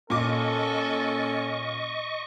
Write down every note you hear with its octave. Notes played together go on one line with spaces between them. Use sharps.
A#2 C#4 A4 D#5 C#6 D6